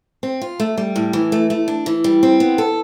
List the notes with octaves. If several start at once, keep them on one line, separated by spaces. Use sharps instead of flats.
C4
F4
A3
G3
A2
E3
A3
A3
D4
E3
G3
C4
B3
A4